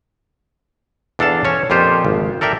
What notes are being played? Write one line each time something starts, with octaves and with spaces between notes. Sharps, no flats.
E2 D4 A4 F5 A5
C#4 C#5
F2 A#2 F4 G4 C5
G#1
A4 A#4 D5 E5 G5